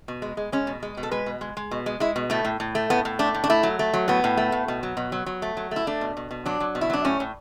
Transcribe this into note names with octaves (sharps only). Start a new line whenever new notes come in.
B2
G#3
G#3
G#3 C#4
B2
G#3
B2
A4
G#3 B4
B2
G#3
G#3
B2
G#3
G#3 E4
B2
A2 A3
A2
A2
A3
A2 B3
A2
A3 D4
A2
D4
A3 E4
F#3
A3
F#3
A2 B3
A2
A3
A2
B2
F#3
B2
F#3
F#3
A3
F#3
A3 E4
A3 D4
B2
B2
B2
F#3 D4
F#3
B2
E4
F#3 D4
A2 C#4
A2